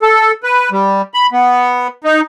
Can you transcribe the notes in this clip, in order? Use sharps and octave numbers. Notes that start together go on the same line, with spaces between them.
A4
B4
G3
B5
B3
D#4